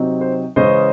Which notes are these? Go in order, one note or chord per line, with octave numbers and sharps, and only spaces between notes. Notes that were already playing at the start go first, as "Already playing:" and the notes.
Already playing: C3 F#3 C4 D#4
C5
C#3 E3 G#3 C#4 C5 D#5